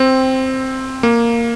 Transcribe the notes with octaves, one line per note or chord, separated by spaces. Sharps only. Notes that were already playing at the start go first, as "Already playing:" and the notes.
Already playing: C4
A#3